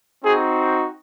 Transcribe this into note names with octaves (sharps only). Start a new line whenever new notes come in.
C4 D#4 F#4 G#4